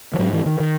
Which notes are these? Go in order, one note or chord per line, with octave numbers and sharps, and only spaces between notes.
E3
G#2 F#3
E3
D#3
D#3